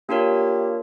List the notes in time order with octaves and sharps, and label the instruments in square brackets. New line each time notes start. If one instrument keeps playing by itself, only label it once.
[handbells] A#3 D4 F4 A#4 C#5 [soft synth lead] G4